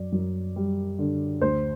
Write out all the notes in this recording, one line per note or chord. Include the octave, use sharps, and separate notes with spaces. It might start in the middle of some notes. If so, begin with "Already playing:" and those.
Already playing: F#2 D5
F#2
G3
D3
D2 C5